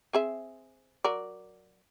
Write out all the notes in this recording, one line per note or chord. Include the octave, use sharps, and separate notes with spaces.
C4 G#4 E5
F#3 A#4 D5